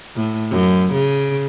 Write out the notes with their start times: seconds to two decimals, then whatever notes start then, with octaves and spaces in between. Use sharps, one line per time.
0.16 A2
0.51 F#2
0.93 C#3